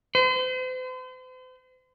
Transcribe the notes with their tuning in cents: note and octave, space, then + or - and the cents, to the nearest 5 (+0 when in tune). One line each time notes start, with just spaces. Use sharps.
C5 -40